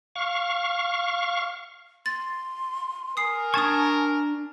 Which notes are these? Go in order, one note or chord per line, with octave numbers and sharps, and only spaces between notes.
F5 C#6
C6 A6
A#4 G#5 D#6 C7
D4 A5 C#6 D#6 G#6